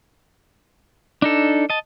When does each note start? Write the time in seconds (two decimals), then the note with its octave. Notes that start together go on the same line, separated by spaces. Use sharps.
1.22 D4 D#4 A4
1.70 D#5 A5